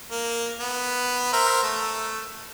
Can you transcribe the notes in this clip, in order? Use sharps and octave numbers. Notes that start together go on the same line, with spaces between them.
A#3
B3
A#4 C5 E5
A3